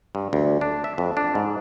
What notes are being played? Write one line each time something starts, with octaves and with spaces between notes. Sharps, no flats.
G2
D2
D4
E5
F2
D4
G#2